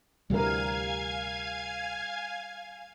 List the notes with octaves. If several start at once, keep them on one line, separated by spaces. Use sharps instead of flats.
D2 C3 E3 G3 A#4 F5 G#5 G#6